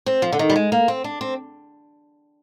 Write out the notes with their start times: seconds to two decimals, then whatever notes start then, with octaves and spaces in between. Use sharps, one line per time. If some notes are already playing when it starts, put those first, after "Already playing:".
0.06 C4
0.22 F3
0.32 D3
0.39 D#3
0.50 G3
0.56 G#3
0.72 A#3
0.88 C4
1.04 D4
1.21 C4